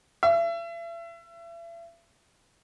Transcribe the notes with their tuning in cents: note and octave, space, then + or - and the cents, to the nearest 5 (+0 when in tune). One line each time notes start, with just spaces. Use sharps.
E5 +40